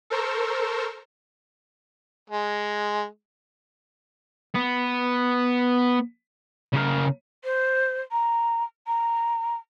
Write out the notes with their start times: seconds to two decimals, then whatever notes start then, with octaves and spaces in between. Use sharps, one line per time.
0.10 A4 A#4 C5 C#6 E6
2.30 G#3
4.54 B3
6.73 C#3 A#4
7.44 C5
8.12 A#5
8.87 A#5